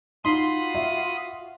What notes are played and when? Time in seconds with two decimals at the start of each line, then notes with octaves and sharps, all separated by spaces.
0.25 D#4 F4 F#4 B5 C6 D#6
0.75 E5